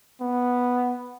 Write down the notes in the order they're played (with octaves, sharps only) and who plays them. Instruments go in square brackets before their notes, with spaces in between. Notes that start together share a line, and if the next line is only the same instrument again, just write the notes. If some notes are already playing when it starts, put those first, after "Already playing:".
[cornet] B3